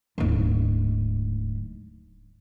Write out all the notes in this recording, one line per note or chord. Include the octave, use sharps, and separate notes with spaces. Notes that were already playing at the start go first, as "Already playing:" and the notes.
D1 G#2